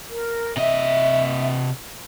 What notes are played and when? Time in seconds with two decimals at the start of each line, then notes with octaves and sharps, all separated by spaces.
0.09 A#4
0.57 C3 D#5 E5